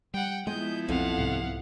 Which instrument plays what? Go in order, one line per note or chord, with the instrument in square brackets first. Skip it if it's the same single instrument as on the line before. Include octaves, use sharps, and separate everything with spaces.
[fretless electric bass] G3 [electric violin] F#5 G5
[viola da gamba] F3 B3 E4 [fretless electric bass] G#3 [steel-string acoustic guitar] D#5 [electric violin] G6
[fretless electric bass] B1 C4 [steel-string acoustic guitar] F2 A4 [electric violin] F5 F#5
[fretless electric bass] C2 G#2 C3